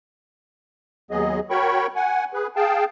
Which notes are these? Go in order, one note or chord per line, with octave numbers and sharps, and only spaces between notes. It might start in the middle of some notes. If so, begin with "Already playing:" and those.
D#2 F#3 B3 G#4 D#5
F#4 A#4 C#5 G5 B5 C#6
F#5 G#5
G#4 B4
G#4 F5 G5 A5